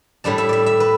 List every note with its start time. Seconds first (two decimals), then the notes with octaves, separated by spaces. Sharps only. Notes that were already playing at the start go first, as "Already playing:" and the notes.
0.24 A2 G3 D4 A5
0.38 E5
0.49 D5 E5
0.66 E5
0.80 B4